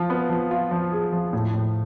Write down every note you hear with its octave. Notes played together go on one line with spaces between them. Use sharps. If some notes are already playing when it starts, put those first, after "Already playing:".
Already playing: F3 F4
B3
F3
F4
F3
G#4
F3
A2
A2